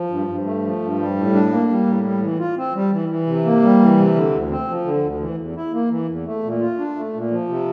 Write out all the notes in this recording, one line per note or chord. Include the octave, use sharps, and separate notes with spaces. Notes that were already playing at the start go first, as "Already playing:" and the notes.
Already playing: F3
G2
G2
A3
F3
G2
G3
A2
D4
A#3
G3
A2
G3
E3
F4
C4
G3
E3
E3
C3
A#3
G3
E3
C3
D3
D2
C4
F3
D3
D2
E3
E2
E4
A#3
E3
E2
A3
A#2
F4
D4
A3
A#2
F3
C3